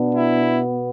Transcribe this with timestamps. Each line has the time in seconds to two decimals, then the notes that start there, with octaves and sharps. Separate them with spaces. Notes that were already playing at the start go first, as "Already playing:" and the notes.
Already playing: B2 B3 D4
0.14 E4